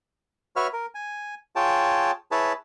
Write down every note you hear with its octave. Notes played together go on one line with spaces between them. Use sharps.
F#4 B4 C#5 E5 F6
A#4
G#5
F4 G#4 C#5 G5 A5
E4 G#4 B4 C#5 A5 B5